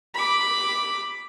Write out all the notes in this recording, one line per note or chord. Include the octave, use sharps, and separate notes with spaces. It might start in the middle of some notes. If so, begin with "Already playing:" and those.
B5 D6